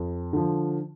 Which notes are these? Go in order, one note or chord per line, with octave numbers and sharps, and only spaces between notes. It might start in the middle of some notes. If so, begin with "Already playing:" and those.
Already playing: F2
D3 F3